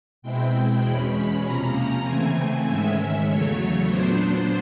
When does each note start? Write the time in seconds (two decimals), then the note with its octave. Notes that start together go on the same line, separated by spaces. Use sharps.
0.22 B2 G#3 C4 E4 G5
0.83 E2 B2 G#3 C#4 B5
1.44 C3 F3 A#3 C#4 A#5
2.05 C#3 E3 A3 C4 G#5
2.66 G#2 D#3 G#3 C#4 E5
3.27 E2 C#3 F#3 A3 C#5
3.88 A#2 F#3 B3 D4 C5